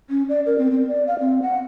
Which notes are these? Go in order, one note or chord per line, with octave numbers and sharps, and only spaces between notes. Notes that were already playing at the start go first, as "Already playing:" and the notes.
C#4
D5
A#4
C4
C4
D5
F5
C4
F#5